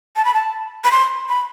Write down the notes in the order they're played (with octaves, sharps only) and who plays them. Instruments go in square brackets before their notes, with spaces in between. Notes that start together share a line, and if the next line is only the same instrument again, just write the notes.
[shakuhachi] A5
B5
A5
B5
C6
B5